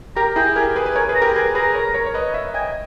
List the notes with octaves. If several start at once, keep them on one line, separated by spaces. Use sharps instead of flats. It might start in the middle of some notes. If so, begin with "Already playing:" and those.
G4 A#4 A#5
E4 G#4 G5
G4 A#4 G#5
G#4 B4
B4
A#4 C#5 G#5
G#4 B4
A#5
G4 A#4
G#4 B4 G#5
G#4 B4 A#5
A#4 C#5
A#4 C#5
C#5
B4 D#5
C#5 E5
D#5 G5 G#5